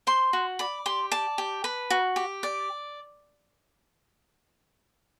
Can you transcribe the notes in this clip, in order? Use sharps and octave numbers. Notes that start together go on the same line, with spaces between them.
C5 C6
F#4
D5 B5
G4 C6
D5 A5
G4
B4
F#4
G4
D5